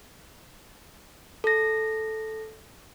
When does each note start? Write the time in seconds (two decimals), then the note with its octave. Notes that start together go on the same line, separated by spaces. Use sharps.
1.44 A4 A#6